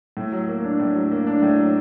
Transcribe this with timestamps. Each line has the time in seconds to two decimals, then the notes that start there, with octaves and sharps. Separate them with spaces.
0.17 A2
0.32 F#3
0.48 A#3
0.64 D4
0.80 A2
0.95 F#3
1.11 A#3
1.27 D4
1.43 A2
1.58 F#3